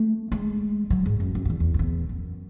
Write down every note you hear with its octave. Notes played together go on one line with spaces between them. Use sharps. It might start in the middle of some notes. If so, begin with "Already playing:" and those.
Already playing: A3
G#3
F#3
G#2
F#2
F#2
F#2
E2
E2
F#2
E2
F#2